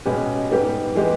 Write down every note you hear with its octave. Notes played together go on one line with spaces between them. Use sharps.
B2 G#3 C#4 G4 B4
G#2 G3 B3 G4
E3 G#3 B3 G4